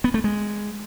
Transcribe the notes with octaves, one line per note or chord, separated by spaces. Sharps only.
B3
A3
G#3